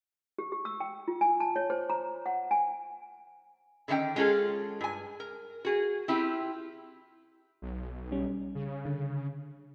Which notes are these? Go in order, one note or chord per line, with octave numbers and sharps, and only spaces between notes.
G4
G4
E6
G5
F4
G#5
A5
C#5
C5
A#5
F#5
G#5
D3 D#3 C#4 E5 G5
G#3 C#4 F4 G#4 A4
G2 G#5
A#4
F#4 G#4
C4 E4 F4 G4
B1
G3 C#4
C#3
D3